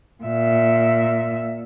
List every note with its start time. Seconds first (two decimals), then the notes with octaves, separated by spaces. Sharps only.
0.23 A#2 E5